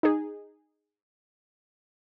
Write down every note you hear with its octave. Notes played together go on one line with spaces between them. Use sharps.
D#4 G#4